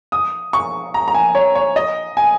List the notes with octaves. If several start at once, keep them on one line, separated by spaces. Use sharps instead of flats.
D#6
C#6
A#5
A#5
G#5
C#5
C#5
D#5
G#5